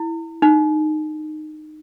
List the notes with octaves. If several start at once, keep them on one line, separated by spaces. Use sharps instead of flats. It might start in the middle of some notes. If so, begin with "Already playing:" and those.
Already playing: E4
D#4